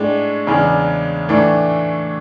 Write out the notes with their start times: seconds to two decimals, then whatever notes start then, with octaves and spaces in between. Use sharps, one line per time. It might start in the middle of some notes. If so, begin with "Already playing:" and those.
Already playing: A2 G#3 D4
0.47 E2 C#3 G#3 D4
1.28 A2 E3 A3 D4